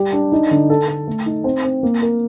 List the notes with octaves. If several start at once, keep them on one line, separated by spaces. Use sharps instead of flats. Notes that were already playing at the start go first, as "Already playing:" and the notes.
Already playing: G3 G4
D4
D#4
D3
A4
A4
A3
D#4
C4
C4
A#3
A#4